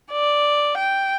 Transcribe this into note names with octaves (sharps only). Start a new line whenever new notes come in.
D5
G5